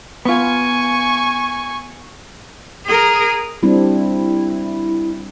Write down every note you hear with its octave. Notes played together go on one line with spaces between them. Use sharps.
B3 F4 G#5 C#6
G#4 A#4
G3 C4 D4 E4